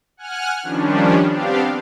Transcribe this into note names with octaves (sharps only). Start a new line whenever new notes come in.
F#5 G#5 F6 F#6
D#3 F3 G3 C#4 D4
B3 C4 D4 G4 F5